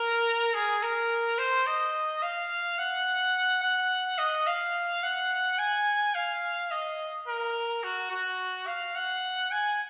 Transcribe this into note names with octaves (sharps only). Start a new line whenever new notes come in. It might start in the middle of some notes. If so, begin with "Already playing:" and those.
Already playing: A#4
G#4
A#4
C5
D#5
F5
F#5
F#5
D#5
F5
F#5
G#5
F5
D#5
A#4
F#4
F#4
F5
F#5
G#5